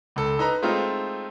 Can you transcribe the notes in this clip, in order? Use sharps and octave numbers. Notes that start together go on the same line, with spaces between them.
C#2 A4
D#4 B4 A#5
G#3 A3 C4 D#4 F4